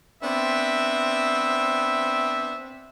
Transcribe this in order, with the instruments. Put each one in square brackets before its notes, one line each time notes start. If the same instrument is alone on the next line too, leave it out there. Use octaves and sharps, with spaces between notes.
[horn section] B3 C4 D4 E5